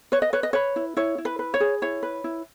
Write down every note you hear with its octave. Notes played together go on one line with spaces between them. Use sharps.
B4 C#5
D#5
B4 C#5
D#5
B4 C#5
E4
E4 C#5
E4
B4
B4
C#5
G#4
E4 C#5
B4
E4